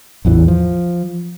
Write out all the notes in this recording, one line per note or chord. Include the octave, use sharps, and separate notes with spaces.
A1 E2 E3
F3